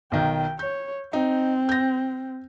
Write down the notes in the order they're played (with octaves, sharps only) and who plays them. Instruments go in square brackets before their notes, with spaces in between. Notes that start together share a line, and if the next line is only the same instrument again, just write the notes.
[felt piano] B1 D#3 [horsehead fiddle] G5
[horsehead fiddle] C#5 [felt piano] G6
[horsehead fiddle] C4 [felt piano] D#4
[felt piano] G6 A#6